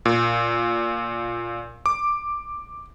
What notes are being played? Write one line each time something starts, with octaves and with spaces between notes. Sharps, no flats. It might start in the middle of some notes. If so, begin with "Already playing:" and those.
A#2
D6